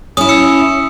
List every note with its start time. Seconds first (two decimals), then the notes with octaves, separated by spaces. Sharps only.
0.17 C#4 E4 D#6
0.29 E6 C#7